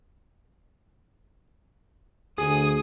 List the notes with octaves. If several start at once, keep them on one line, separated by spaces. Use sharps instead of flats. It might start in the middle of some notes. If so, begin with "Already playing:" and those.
D2 G#4 G#5 D#6